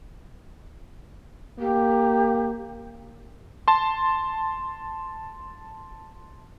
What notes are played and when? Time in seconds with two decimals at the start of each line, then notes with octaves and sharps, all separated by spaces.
1.60 A#3 G4
3.68 A5 C6